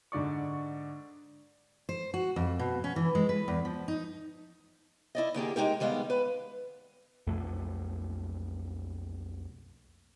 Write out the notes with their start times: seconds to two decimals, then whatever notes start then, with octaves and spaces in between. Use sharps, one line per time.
0.12 G#2 D3 D5 C#6
1.89 C5
2.14 F#4
2.36 F2
2.59 B2
2.84 C#4
2.96 E3
3.15 G#3
3.29 B4
3.48 E2
3.65 F3
3.88 D#4
5.15 E4 D5 D#5
5.34 D2 A#3 G4 G#4
5.56 G#3 A#3 D#4 G4 A#4
5.80 D#3 G3 G#3 B3 F5
6.10 B4
7.27 B1 F2 A3